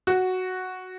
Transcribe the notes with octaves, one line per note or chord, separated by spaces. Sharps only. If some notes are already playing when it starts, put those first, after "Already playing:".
F#4